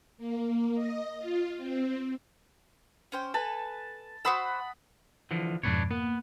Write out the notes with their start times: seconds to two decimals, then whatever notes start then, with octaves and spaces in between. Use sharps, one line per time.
0.18 A#3
0.75 D#5
1.19 F4
1.57 C4
3.12 C#4 C5 G5
3.34 A4 B4 G#5 A5
4.25 F#4 C5 F#5 B5 D#6 E6
5.31 D3 E3 F3
5.63 F2 G#2 B2 D4 B4 C#5
5.91 A#3 B3